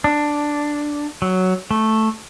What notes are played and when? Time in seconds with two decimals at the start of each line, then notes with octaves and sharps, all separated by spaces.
0.04 D4
1.22 F#3
1.71 A3